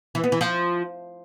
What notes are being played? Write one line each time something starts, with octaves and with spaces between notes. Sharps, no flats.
E3
B3
E3
F3